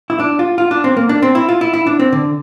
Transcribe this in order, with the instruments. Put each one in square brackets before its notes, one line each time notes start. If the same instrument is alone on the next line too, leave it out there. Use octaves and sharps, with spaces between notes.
[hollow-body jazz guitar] E4
D4
F4
F4
D4
C4
A#3
D4
C4
E4
F4
E4
E4
D4
C4
D3